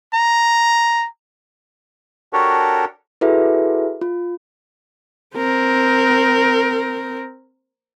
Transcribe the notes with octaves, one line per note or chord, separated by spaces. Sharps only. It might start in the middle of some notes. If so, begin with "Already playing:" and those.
A#5
D4 F#4 G4 A4 A#4 C#5
E4 F#4 G#4 A4 B4 E5
F4
C4 A#4